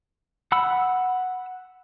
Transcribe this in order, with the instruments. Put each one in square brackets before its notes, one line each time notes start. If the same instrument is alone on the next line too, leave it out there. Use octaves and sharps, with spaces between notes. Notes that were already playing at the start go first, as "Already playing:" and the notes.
[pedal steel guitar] F#5 B5 E6